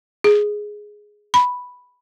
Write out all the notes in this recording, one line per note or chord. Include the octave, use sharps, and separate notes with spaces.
G#4
B5